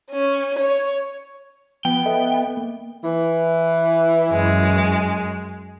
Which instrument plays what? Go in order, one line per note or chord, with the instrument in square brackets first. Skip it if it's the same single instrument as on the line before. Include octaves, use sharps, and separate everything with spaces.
[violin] C#4
C#5
[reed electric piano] F3 [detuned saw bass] B3 [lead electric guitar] G5
[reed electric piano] A4 D#5 E5
A#3
[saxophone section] E3
[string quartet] F#2 G#3